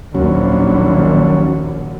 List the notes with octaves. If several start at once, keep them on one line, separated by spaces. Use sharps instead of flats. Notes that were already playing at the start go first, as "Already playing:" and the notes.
A#1 D#2 F#3 C#4